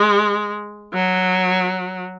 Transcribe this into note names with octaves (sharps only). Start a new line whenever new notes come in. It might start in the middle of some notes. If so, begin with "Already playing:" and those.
Already playing: G#3
F#3